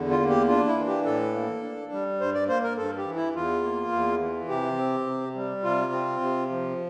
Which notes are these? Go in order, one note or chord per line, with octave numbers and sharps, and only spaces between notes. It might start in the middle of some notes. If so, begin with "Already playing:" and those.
Already playing: E2 D3
F4
A#3
G4
D4 F4
E4
E3
G4
A2 A4
A#3
D4
G3
G2 C5
D5
A#3 C5
A#4
G2 A4
G4
E3
E4
E2 F4
A#3
E2
E3
C3 G4
C4
C3
G3
C3 F4
C4
C3
F3